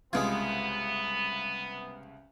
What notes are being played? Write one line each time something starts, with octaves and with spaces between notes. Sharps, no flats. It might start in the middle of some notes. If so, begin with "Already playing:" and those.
C2 C#3 G#3 B3 F4 G#6